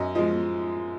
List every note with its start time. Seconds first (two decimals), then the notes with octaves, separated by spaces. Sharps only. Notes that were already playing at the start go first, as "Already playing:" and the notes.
Already playing: F#2 D#5
0.15 F3 G#3 D#5